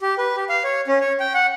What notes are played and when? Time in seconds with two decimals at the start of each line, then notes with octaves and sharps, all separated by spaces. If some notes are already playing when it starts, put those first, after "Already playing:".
0.02 G4
0.18 B4
0.36 G4
0.49 F5
0.64 C#5
0.88 C#4
1.01 C#5
1.20 G5
1.34 F#5